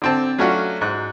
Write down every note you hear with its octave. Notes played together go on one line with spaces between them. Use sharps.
D3 C4 A5
F#3 A3 C#4 D4 F4 F#4
G#2 F#6